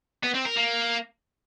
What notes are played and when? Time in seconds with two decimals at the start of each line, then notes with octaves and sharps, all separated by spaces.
0.24 B3
0.35 C4
0.46 A#4
0.57 A#3